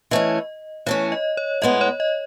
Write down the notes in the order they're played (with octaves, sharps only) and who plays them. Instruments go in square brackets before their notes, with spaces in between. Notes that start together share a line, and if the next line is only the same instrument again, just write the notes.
[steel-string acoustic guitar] E3 A3 C#4 [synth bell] D#5
[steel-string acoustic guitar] E3 A3 C#4 [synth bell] C#5
[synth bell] D#5
C#5
[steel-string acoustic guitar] A2 G#3 B3 [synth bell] D#5
[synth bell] C#5
D#5